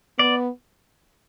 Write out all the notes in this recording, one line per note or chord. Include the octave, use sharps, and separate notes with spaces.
B3 D5